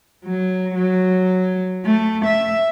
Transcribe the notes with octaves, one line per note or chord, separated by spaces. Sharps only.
F#3
F#3
A3
E5